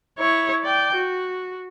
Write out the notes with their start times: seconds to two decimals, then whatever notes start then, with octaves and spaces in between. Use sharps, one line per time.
0.19 E4 C#5
0.63 D5 G5
0.96 F#4